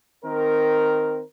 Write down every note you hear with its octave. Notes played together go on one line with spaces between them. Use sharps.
D#3 C4 A#4